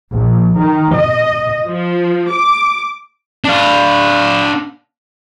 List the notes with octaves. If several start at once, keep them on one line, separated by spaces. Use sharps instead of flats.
A#1
D#3
D#5
F3
D6
D4 F5